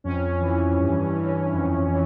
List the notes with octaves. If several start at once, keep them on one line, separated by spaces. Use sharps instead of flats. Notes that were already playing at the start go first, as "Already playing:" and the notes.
F2 C#4
E3
G2
E3
F2
E3